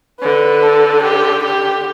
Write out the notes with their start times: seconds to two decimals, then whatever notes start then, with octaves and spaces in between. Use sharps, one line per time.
0.21 D3 B4
0.63 A4
1.03 G4
1.44 G4